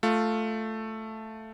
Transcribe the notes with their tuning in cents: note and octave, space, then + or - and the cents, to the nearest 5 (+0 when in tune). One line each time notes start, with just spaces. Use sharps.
A3 +0 F4 +5